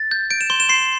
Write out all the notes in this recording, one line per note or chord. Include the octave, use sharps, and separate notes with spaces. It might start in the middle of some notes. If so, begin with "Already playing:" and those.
Already playing: A6
G6
G6 D7
E7
C6 G7
E7
C6 C7